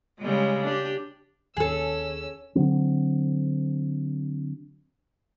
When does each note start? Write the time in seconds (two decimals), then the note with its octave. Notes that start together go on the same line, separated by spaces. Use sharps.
0.20 C#3 G3 G#3
0.64 D4 G4
1.57 D#2 C#4 G#4 A4 E6
2.55 D3 E3 F#3 C4